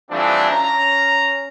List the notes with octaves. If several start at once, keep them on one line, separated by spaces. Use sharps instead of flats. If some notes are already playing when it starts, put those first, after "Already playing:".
E3 F3 G3 A3 C4 D4
C#4 A#5